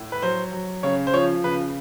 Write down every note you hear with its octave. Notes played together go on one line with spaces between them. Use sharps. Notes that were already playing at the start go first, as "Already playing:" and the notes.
Already playing: A2
B4
F#3 C5
F#3
C#3 C#5
C5
F3 C#5
C#3 B4